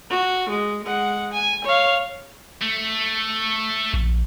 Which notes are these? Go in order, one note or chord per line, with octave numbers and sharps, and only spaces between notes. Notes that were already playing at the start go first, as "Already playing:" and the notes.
F#4
G#3
G#3 F#5
G#5
C#5 F5
A3
A#1